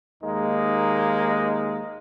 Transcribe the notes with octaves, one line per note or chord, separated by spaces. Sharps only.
D#2 G#3 A#3 D#4